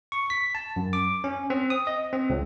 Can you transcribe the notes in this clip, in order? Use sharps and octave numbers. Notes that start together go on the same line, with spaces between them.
C#6
B6
A5
F#2
D6
C#4
C4
D#6
D#5
C4
C#2